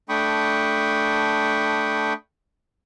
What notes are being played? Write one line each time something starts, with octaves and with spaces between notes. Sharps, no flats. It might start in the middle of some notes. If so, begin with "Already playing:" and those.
A3 D4 G5 B5 C#6 D#6